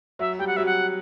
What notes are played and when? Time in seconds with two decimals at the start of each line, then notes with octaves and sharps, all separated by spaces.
0.19 F#3 E5
0.39 G3 G5
0.47 F#5
0.57 F#3 E5
0.66 F#5